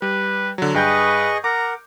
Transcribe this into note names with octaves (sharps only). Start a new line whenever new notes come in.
G3 B4
D3 F#3
G2 G#4 B4 D#5 G5 C#6 G6
A#4 F#5 A#5 D6